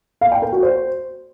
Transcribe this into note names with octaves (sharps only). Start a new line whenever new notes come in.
F5
G5
A#4
F#4
C5